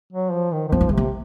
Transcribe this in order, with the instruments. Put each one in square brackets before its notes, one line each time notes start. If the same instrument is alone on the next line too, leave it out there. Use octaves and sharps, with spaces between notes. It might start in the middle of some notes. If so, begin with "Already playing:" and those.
[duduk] F#3
F3
D#3
D#3
[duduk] F3 [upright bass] C4
[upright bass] A#3
G#3
[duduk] C3
[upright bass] A#3